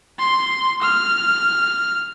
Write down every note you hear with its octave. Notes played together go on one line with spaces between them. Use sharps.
C6
F6